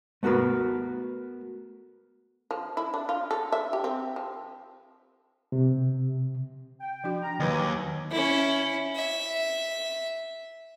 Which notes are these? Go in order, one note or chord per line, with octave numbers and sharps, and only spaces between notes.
A3 B3 F#4 A#4 B4
F3
E4
D4
F4
A4
E5
G4
C4
F3
C3
G5
F3 D4 F#4
A#5
D#2 F#3 B4 G#5 A#5 B5 D6
C#4 E4
E5